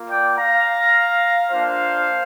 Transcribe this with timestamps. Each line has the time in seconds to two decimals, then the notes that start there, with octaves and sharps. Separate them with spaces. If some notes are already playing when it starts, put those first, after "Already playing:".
Already playing: A#3 F4
0.09 D5 G5
0.37 F5 A#5
1.50 A#3 D4 F4 C5 F5